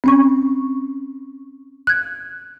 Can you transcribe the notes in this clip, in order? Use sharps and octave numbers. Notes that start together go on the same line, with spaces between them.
C4 C#4 C#6
F#6 G#6